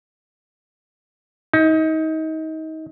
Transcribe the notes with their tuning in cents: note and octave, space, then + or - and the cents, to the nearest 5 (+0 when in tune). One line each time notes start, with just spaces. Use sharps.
D#4 +30